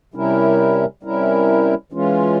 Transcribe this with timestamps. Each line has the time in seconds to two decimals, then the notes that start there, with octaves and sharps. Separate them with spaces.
0.14 C3 G3 C#4 E4 A#4
1.03 C3 G3 C#4 E4 A#4
1.92 E3 G#3 C#4 F4